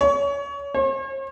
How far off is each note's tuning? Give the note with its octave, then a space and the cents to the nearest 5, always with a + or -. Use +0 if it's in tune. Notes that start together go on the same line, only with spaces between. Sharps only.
C#5 +25
C#5 -45